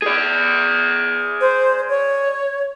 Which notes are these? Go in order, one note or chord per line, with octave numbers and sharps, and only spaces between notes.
G#4 D5
C5
C#5